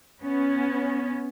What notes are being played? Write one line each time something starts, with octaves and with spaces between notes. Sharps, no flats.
B3 C#4